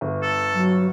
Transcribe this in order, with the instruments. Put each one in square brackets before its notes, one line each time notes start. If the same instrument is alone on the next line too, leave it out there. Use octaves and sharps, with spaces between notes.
[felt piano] G1
[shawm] A4
[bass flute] F#3